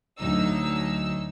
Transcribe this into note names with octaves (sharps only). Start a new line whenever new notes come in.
D2 F#3 D#4 E6